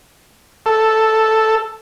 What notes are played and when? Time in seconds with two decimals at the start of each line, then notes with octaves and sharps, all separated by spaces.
0.66 A4